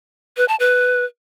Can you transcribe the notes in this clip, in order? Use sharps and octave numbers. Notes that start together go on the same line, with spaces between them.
B4
A5
B4